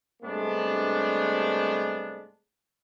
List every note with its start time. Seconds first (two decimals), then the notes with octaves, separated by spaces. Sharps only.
0.23 G2 C3 G#3 A3 B3 D4